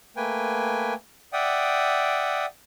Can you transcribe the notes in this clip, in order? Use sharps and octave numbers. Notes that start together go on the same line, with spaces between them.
A3 A#3 B4 G5 G#5
D5 E5 F#5 G5 D#6